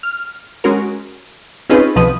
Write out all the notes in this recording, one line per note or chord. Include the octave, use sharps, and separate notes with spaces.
F6
G#3 C#4 F#4 A#4
C4 C#4 D#4 F4 G#4 B4
C2 B2 F3 B4 D#6